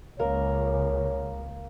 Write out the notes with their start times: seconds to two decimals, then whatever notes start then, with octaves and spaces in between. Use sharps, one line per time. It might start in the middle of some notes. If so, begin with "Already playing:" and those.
0.20 C#2 A#3 A#4 C#5